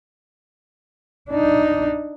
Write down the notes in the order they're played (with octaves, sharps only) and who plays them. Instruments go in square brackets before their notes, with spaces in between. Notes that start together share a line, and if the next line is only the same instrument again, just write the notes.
[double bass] D4 D#4